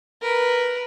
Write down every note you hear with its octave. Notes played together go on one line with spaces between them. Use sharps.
A#4 B4